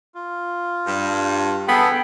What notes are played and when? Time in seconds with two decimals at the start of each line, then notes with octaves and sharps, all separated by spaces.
0.14 F4
0.87 G2
1.68 B3 G#4 A4 B4 G5